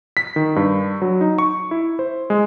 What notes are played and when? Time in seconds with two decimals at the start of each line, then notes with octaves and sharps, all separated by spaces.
0.17 B6
0.36 D#3
0.56 G2
1.02 F#3
1.21 D#4
1.38 C#6
1.71 E4
1.99 C5
2.30 G#3